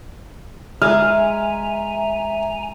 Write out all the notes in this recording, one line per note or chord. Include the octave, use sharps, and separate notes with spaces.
G#3 E5 G#5 A#5 F6